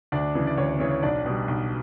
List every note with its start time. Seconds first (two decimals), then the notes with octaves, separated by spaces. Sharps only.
0.12 D2 D4 D5
0.35 C#3 E3
0.47 D5
0.57 D2 C#5
0.69 C#5
0.80 C#3 E3 C#5
0.91 C#5
1.03 B1 D4 D5
1.26 B2 G3
1.48 B1